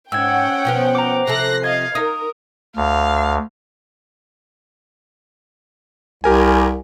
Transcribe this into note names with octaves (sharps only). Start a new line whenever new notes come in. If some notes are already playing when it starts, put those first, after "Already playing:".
G#2 C#4 F#5 G5 E6 G#6
B2 F3 B3
A#5 D6
C3 F3 A4 F#6 A#6 C7
D#5 F5 G#6
D#4 A#4 D#6
D2 F5
C2 G4 A#4 G#5